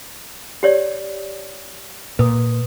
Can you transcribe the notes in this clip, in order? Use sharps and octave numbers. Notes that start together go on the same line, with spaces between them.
G4 C#5 D5
A#2 B4 D#6